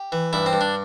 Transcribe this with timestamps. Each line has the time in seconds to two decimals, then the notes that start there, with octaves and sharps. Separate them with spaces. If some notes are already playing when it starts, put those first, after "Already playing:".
Already playing: G4
0.12 E3
0.33 G2 E4
0.46 C4
0.53 G2
0.61 D4